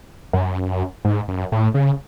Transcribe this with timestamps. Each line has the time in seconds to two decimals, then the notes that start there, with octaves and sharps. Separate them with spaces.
0.33 F#2
1.05 G#2
1.28 F#2
1.52 A2
1.74 C#3